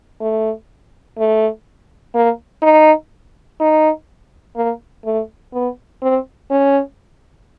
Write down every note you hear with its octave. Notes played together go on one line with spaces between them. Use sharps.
A3
A3
A#3
D#4
D#4
A#3
A3
B3
C4
C#4